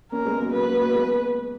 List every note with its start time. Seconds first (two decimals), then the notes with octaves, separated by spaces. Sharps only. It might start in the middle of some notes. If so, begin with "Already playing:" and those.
0.12 A#3 C#4 A#4
0.25 G#3 B3
0.39 F#3 A#3
0.53 F#3 B4
0.66 F#3 A#3
0.80 F#3 A#3
0.93 G#3 B3